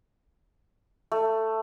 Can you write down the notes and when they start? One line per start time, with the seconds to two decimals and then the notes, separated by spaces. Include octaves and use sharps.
1.12 A3